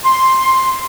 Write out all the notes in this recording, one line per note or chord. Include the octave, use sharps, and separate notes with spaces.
C6